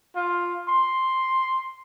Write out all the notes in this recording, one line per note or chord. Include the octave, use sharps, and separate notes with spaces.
F4
C6